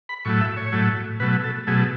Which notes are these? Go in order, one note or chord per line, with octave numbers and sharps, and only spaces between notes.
B5
A2 F#3 A3 C#6
E5
C#5
A2 F#3 A3
B2 F#3 A3 B4
A4
B2 F#3 A3 G#4